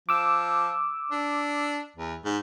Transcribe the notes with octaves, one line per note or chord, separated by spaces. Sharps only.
F3 D6 E6
D4
E2
G#2